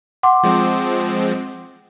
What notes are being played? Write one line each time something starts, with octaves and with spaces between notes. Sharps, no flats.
F#5 C6 D6
F3 G#3 C4